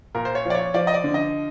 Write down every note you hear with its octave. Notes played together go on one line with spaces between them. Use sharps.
A#2 A#4
C5
C#5
F3
D5
C#5
F3 D5
D#5
D5
D3
D#5